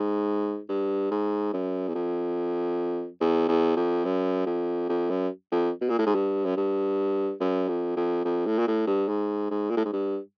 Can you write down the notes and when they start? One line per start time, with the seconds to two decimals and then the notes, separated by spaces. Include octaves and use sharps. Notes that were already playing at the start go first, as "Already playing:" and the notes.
Already playing: G#2
0.69 G2
1.11 G#2
1.53 F#2
1.88 E2
1.95 F2
3.21 E2
3.49 E2
3.76 F2
4.05 F#2
4.46 F2
4.89 F2
5.10 F#2
5.52 F2
5.81 B2
5.89 A#2
5.98 A2
6.06 G#2
6.15 G2
6.45 F#2
6.57 G2
7.40 F#2
7.69 F2
7.96 F2
8.25 F2
8.46 A2
8.59 A#2
8.67 A2
8.87 G2
9.08 G#2
9.51 G#2
9.70 A#2
9.77 A2
9.85 G#2
9.93 G2